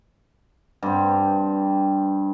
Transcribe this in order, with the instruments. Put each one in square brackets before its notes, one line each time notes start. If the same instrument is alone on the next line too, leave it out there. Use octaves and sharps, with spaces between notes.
[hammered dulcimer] G2 C4